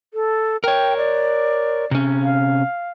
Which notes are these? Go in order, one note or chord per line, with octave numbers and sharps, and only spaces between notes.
A4
A#4 C#5 G5
D5
C3 C#4
F5